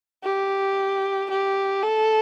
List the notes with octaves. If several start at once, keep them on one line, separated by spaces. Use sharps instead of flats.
G4
G4
A4